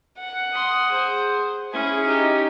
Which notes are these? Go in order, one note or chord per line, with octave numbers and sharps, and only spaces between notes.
F#5
C6 D#6
G#4 C5
C#4 E4 G#4
D#4 G4